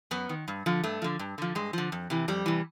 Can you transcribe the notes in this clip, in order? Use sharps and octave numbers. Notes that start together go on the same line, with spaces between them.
F#2 B3
D#3
G2
D3 F3
G2 A3
D3 F3
G2
D3 F3
G2 G#3
D3 F3
F2
C3 E3
F2 G3
C3 E3